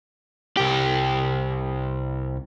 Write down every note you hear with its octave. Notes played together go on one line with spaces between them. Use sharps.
C2 G4